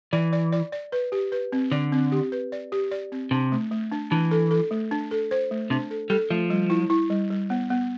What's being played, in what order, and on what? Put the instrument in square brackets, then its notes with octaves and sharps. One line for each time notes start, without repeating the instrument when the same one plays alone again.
[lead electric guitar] E3 [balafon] D5
[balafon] D5
D5
D5
B4
G4
B4
C4
[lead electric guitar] D3 [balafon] D5
[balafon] C4
G4
B4
D5
G4
D5
C4
[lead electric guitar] C3 [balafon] D4
[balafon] A3
A3
D4
[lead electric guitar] E3 [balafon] D4
[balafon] A4
A4
A3
D4
A4
C5
A3
[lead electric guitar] C3 [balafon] D4
[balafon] A4
[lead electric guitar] G3 [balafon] A4
[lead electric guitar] F3 [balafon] A3
[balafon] G3
E4
E4
G3
G3
B3
B3